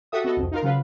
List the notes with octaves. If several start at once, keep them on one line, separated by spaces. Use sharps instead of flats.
F#4 G4 A4 E5 D#6
B3 F#4 A4 D#5
C2 F2
D#4 F4 A#4
C#3 F#3 F4 B4